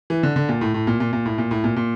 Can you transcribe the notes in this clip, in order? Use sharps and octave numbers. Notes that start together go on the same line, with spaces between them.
E3
D3
D3
A#2
A2
A2
A#2
A#2
A#2
A2
A#2
A2
A#2
A#2